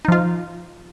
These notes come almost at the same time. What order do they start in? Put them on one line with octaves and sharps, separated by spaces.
D#4 F3 F4